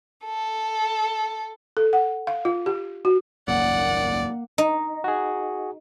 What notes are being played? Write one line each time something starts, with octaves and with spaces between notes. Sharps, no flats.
A4
A4
F#5
F5
F4
G4
F#4
G#1 C#2 F#2 A#3 D5 F#5
D#4
F#4 G#4